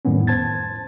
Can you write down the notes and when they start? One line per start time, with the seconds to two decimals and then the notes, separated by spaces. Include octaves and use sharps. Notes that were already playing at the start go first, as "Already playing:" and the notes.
0.05 F2 A2 D#3 G3 B3 C#4
0.27 C5 A5 G#6 A6